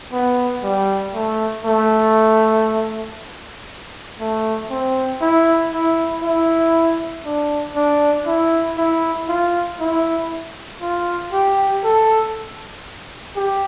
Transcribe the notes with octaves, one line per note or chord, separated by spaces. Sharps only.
B3
G3
A3
A3
A3
C4
E4
E4
E4
D4
D4
E4
E4
F4
E4
F4
G4
A4
G4